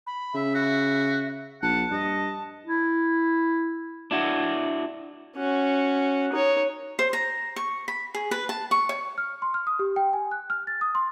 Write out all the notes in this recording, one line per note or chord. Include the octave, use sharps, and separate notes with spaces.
B5
C#3 E5
F#4 E5
A#1 F#5 A5
G2 D#5
E4
D4 E4 F#4
C#4 F#4
D#4 C#5
C5
A#5
C#6
B5
G#4
B4
A5
C#6
C#5
F6
C6
F6
D#6
G4
G5
G#5
F#6
F6
A6
D#6
C6